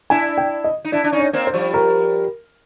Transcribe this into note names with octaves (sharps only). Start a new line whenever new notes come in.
D4 E4 G#5
G5
D#5
D#4
D4 E4 D5
D4
C#4 D#4
C#5
A#3 C4
C5
F3 G3
A#4